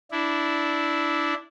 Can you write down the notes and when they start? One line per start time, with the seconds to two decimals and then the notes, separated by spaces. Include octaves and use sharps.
0.12 D4 E4